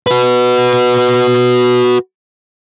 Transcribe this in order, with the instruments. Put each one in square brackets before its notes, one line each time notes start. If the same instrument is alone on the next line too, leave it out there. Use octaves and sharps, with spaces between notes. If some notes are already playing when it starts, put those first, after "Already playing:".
[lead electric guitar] F#4 B4